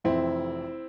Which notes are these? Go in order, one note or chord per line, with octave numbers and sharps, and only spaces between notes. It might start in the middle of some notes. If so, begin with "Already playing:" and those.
F1 F2 E3 C4 E4